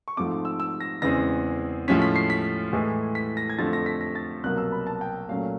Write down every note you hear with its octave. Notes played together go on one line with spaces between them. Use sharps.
C#6
G#2 F3 A3 C4 D6
E6
E6
A#6
E2 C#3 E3 G#3 C4 A#6
A2 F3 G#3 C#4 B6
B6
C7
B6
A2 E3 G#3
B6
A#6
G#6
F2 D3 F3 A3 C4 A6
A#6
B6
A#6
A6
C2 B2 F#3 A#3 F#6
E6
B5
A5
G5
A#2 F#3 A3 C#4 F5